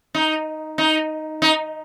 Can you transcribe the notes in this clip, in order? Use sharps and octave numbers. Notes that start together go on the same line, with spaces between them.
D#4
D#4
D#4